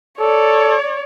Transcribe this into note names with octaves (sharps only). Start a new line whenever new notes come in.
A4 C#5 D5